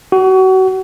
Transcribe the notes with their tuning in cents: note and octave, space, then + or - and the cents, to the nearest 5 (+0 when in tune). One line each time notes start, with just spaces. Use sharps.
F#4 +30